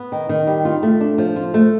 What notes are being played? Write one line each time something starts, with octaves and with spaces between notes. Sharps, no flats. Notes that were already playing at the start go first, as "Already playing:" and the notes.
Already playing: B3
D#3
D#3
G3
F4
A3
D4
F3
F4
A3